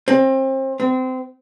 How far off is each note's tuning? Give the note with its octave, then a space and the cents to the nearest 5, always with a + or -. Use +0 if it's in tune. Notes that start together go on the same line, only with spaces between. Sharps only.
C4 +30
C4 -25